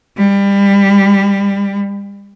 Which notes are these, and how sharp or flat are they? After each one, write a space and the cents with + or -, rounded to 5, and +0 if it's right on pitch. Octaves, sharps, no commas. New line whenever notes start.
G3 +25